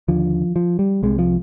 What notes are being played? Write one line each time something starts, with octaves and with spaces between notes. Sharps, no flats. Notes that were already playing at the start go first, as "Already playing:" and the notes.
D#2 D3 F3
F3
G3
C2 C3 G#3
F3